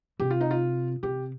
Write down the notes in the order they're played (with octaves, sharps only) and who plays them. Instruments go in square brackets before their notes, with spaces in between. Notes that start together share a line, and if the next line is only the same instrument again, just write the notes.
[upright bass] C3 [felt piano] G4
[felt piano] F4
D#4
F4
[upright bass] C3 [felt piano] G4